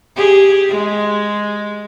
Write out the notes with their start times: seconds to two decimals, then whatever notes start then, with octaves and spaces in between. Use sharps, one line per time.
0.16 G4 G#4
0.69 G#3